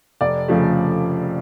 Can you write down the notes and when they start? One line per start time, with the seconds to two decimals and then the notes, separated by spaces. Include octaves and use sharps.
0.21 F1 D5
0.48 F2 C#3 F3 A3